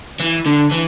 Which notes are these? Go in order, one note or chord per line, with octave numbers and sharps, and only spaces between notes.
E3
D3
E3